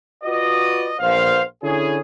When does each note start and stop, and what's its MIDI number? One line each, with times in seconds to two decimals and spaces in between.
0.24 0.94 65
0.24 0.94 66
0.24 0.94 71
0.24 0.94 74
0.24 0.94 75
1.00 1.41 34
1.00 1.41 59
1.00 1.41 72
1.00 1.41 77
1.63 1.99 50
1.63 1.99 61
1.63 1.99 64
1.63 1.99 68